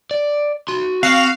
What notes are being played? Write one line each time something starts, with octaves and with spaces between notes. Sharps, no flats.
D5
F#4 C6
C4 F#4 F5